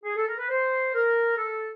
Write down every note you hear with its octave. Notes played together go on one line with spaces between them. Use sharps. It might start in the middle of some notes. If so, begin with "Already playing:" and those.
G#4
A4
A#4
B4
C5
A#4
A4